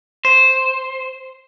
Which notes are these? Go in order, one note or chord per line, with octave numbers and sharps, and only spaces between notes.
C5